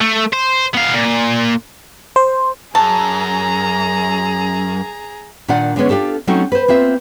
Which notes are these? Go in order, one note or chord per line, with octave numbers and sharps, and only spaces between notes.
A3
C5
B3 F5
A#2
C5
F#2 G#4 A5 A#5
A#2 D#3 D4 F4 D5 F#5
D3 G#3 A3 B3 C#4 C#5
D4 F4 G4 A4
F#3 A3 C4 C#4 D#4 F#4
B4 C5
A#3 C4 F4 E5